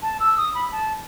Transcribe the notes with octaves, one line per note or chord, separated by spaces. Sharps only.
A5
E6
D#6
B5
A5